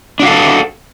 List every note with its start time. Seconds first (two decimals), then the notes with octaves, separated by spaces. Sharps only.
0.20 D4
0.22 F#4
0.25 F5
0.28 A4